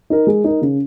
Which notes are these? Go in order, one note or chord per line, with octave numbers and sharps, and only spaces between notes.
D#4 A#4
G#3
D#4 A#4
C#3